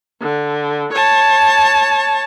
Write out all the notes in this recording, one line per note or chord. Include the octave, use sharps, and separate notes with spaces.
D3
C#5 A5